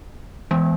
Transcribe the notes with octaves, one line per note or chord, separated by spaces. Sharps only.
E3 G#3 B3